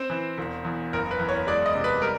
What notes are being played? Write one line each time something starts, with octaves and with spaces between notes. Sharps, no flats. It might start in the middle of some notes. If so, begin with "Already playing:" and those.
Already playing: C4 C5
E3
E1
E2
F#1 A#4
B4
E2
C#5
G#3 D5
D#5
C3
B4
G3 A#4